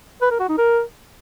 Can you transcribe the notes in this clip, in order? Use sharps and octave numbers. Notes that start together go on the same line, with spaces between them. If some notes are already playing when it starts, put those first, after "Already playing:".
B4
A#4
F#4
D#4
A#4